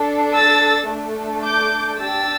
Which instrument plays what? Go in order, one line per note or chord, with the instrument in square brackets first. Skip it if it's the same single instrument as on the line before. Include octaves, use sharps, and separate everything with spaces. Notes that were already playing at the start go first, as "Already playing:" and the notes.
Already playing: [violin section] D4 A4
E6 A6
A3 D4 A4
D6 G6
D4 G4 E6 A6